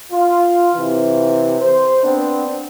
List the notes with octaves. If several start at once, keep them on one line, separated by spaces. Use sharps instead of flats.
F4
C3 E3
C5
B3 C4 D4